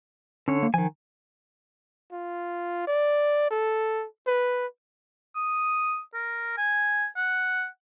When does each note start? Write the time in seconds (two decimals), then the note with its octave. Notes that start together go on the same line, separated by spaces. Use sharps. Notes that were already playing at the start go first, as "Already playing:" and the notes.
0.48 D3 C#4 C#5
0.63 A#3
0.74 D#3 F3 G#5
2.12 F4
2.87 D5
3.50 A4
4.27 B4
5.36 D#6
6.14 A#4
6.58 G#5
7.16 F#5